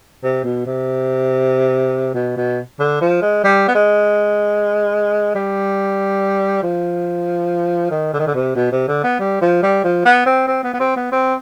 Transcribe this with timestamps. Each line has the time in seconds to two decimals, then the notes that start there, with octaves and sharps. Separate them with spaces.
0.23 C3
0.44 B2
0.66 C3
2.14 B2
2.37 B2
2.79 D3
3.01 F3
3.22 G#3
3.44 G3
3.68 B3
3.75 G#3
5.35 G3
6.63 F3
7.91 D#3
8.13 D3
8.19 D#3
8.27 D3
8.35 C3
8.56 B2
8.72 C3
8.88 D3
9.04 B3
9.20 G3
9.41 F3
9.63 G3
9.84 F3
10.05 B3
10.26 C4
10.47 C4
10.64 B3
10.74 B3
10.80 C4
10.96 B3
11.12 C4